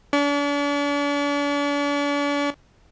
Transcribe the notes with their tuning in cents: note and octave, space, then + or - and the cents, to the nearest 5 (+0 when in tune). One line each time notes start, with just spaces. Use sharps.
D4 -40 D6 -45